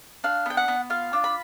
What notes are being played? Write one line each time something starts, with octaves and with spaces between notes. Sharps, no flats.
D4 F5
B3 G5
F#5
B3
F4 F5
D4
B5